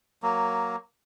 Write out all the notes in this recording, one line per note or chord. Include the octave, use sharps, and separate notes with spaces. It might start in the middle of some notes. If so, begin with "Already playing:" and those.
F#3 A#3